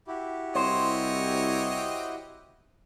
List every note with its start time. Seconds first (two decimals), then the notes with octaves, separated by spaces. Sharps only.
0.07 E4 F#4 G4
0.55 C2 C4 C5 C#5 D#5